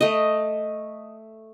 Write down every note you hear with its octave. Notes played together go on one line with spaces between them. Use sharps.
A3 D#5